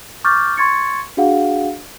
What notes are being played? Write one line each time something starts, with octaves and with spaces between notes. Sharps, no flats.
C#6 D6 F6 G6 A6
C6 C#6 G#6 A6 C#7
D4 F#4 G#4 F5 F#5